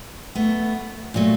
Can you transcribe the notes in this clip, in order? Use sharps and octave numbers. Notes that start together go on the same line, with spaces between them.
A3 B3
A#2 F#3 A3